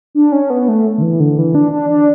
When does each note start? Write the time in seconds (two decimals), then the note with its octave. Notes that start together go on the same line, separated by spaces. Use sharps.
0.15 D4
0.32 C#4
0.50 B3
0.68 A3
0.98 D3
1.02 E3
1.20 D3
1.38 E3
1.55 D4
1.72 D4
1.90 D4